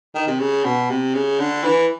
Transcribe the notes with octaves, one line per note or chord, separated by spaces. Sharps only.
D#3
C3
C#3
B2
C3
C#3
D3
E3